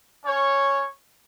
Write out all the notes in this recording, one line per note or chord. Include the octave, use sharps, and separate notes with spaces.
C#4 C#5